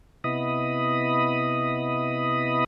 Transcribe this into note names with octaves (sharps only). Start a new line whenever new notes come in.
C3 B3 E4 D#5 B5 D#6